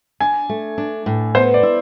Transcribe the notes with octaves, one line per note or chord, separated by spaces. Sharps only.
D4 G#5
A3
D4
A2
B3 C5
D5
E4